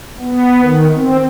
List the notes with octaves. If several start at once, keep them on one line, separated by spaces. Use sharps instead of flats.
B3
D#3
C4